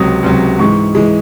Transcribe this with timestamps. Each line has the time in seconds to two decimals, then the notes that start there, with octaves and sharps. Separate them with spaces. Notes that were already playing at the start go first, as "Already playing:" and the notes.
Already playing: C#2 C3 F#3 D#6
0.23 C#2 C3 F#3
0.59 G#2 E3 G#3 C#6
0.95 E3 G#3